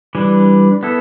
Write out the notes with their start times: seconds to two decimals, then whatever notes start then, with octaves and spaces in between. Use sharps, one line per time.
0.15 E3 G3 D4
0.83 B3 E4 A4